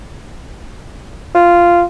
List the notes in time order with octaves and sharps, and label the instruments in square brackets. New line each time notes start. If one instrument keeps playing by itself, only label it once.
[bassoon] F4